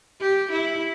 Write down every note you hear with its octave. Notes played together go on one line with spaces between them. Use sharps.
G4
E4